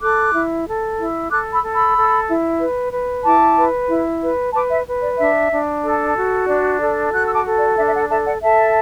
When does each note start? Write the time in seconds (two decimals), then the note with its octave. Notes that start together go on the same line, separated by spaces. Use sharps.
0.01 A4 D6 F#6
0.34 E4
0.67 A4
0.99 E4
1.31 A4 D6 F#6
1.52 B5 E6
1.63 A4
1.74 B5 E6
1.96 A4
2.28 E4
2.60 B4
2.92 B4
3.24 E4 A5 D6
3.57 B4
3.89 E4
4.22 B4
4.54 B4 A5 D6
4.70 E5
4.87 B4
5.03 D5
5.19 D4 E5
5.51 D4
5.83 A4
6.15 F#4
6.48 D4 D5
6.80 A4 D5
7.13 F#4 F#6
7.25 E6
7.34 A5 D6
7.45 A4
7.56 D5
7.77 D4 E5
7.87 E5
7.93 D5 F#5
8.10 A4 E5 A5
8.26 D5 F#5
8.42 A4 E5 A5